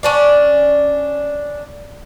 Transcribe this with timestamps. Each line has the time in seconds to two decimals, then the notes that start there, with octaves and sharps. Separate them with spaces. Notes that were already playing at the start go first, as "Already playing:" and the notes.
0.03 C#4 D4 D5